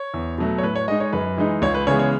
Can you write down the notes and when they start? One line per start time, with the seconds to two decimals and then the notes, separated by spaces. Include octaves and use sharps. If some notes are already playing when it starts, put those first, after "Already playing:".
Already playing: C#5
0.14 E2
0.38 B2 F#3 A3
0.58 C#5
0.63 A2 B4
0.76 C#5
0.88 G#3 D#4 D#5
1.00 C#5
1.13 F#2 B4
1.38 E3 G#3 D#4
1.62 C#2 C#5
1.75 B4
1.87 C#3 E3 G#3 B3 C#5
1.99 C#5